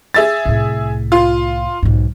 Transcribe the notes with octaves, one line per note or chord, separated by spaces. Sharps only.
G#4 E5 A6
C2 A2
F4
B1 G#2